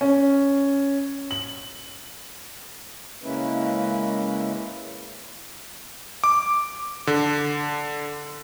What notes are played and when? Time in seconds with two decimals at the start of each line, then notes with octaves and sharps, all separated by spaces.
0.01 C#4
1.31 F#7
3.23 C#3 G#3 A#3 C#4 E4 B4
6.24 D6
7.07 D3